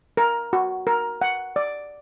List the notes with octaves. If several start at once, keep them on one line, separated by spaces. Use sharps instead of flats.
A#4
F#4
A#4
F#5
D5